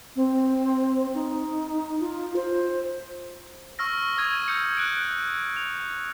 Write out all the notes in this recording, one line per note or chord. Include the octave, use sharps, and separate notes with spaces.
C4
D#4
F4
C5
C#6 E6 F6 A#6
C#6 D#6 E6 G#6 A#6 D#7
E6 G6 C#7
F#6 D7
F7